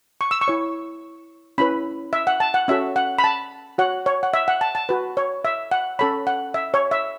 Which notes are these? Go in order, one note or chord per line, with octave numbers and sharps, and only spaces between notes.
C#6
E6
C#6
E4 C#5
C#4 E4 B4 B5
E5
F#5
A5
F#5
C#4 F#4 A4 E5
F#5
B5
A5
F#4 C#5 F#5
C#5
F#5
E5
F#5
A5
A5
F#4 B4
C#5
E5
F#5
C#4 A4 C#5 B5
F#5
E5
C#5
E5